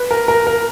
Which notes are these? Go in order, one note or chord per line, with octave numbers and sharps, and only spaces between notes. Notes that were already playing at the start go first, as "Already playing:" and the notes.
Already playing: B4
A#4
A#4
A#4